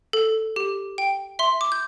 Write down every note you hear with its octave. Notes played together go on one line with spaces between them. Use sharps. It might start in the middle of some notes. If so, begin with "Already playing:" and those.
A4
G4
G5
E5 C6
D6
G6